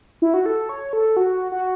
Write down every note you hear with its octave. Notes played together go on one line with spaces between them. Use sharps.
E4
F#4
A4
C#5
A4
F#4
F#4